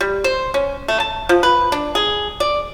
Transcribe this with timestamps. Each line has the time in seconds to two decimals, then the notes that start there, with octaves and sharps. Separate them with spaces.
0.01 G3
0.24 C5
0.54 C#4
0.88 A3
1.00 A5
1.29 F3
1.43 B4
1.72 D4
1.95 G#4
2.40 D5